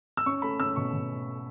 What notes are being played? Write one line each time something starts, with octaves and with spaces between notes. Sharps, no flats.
E6
C#4 C#6
A3 B5
C#4 E6
B2 C#6
B2